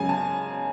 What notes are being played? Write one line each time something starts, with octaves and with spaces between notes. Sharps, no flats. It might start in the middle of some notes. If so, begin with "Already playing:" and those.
Already playing: F#2 C#3 G#3 G#5
A5